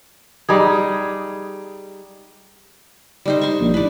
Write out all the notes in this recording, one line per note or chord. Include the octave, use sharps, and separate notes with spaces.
G3 D#4 G#4
G3 D#4 C5
C6 C#6
A#1
A2 B4 D5